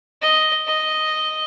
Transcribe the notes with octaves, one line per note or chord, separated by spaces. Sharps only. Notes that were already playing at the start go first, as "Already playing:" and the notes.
D#5
D#5